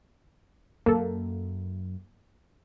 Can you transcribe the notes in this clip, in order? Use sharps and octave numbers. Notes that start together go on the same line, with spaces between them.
F#2 A#3 A4